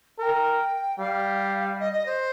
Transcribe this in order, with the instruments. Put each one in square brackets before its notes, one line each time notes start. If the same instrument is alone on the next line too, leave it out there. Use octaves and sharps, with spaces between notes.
[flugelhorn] A#4 [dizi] G5 A#5
[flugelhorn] G3 [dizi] F5
[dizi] D#5
D#5
C5